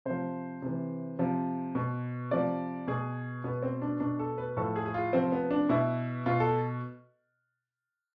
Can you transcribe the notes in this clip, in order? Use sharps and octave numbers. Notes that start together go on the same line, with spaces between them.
C3 F3 C5
C3 E3
C3 F3
B2
C3 F3 D5
B2 G#4
B2 B3
C4
D4
B2 D4
A4
B4
A2 F3 A4
G#4
G#4
F4
C3 F3 C4
B3
D4
B2 E4
B2 F4
A4